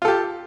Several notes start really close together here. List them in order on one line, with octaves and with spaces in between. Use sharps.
F4 A4 G4